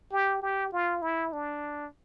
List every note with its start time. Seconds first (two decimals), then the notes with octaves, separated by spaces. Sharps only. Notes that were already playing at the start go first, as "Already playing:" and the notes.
0.12 G4
0.42 G4
0.72 F4
1.02 E4
1.33 D4